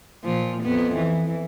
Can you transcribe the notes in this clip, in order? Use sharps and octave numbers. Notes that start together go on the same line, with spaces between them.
A#2 F3
F2 B3
E3